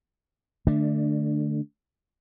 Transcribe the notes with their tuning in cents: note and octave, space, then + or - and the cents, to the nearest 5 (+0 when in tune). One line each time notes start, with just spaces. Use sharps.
D3 +25 A3 +0 D4 +5